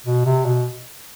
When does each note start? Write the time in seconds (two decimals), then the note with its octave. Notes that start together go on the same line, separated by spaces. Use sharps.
0.06 B2
0.26 C3
0.45 B2